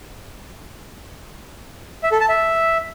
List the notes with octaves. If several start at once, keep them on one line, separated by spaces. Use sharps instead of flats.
E5
A4
A5
E5